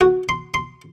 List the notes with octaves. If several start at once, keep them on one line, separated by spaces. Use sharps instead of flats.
F#4
C6
C6